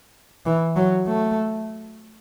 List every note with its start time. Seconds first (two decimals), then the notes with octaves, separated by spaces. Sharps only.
0.46 E3
0.76 F#3
1.08 A3